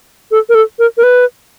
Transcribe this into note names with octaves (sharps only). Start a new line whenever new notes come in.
A4
A#4
A4
A#4
A#4
B4